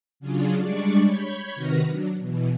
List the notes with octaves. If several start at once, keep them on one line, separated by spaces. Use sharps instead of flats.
C#3 F#3 C#4 D4 F4 G#4
G3 G#3 D4 D5 C#6
C#5 B5 G6 G#6
C3 D#3 F#4 B4 F6 A#6
F#3 D4
B2 E3